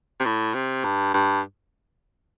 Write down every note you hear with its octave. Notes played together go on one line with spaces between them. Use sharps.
C3
A2
C3
G2
G2